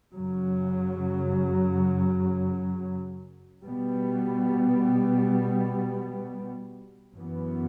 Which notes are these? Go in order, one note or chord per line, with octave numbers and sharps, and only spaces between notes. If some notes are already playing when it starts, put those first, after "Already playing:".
F#2 C#3 F#3
B2 G3 B3
F#2 E3 B3